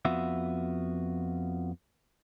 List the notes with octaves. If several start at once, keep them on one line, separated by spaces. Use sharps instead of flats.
F2 B3 F4 F#4 E5